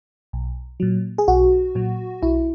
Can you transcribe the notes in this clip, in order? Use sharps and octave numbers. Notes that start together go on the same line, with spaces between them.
B1
A#2 F#3
G#4
B1 F#4
A#2 F#3
B1 E4